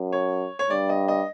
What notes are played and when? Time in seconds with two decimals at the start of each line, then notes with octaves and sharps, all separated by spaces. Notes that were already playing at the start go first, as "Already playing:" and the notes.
Already playing: F#2
0.12 C#5
0.59 C#5
0.70 G2 D5
0.89 D#5
1.08 D#5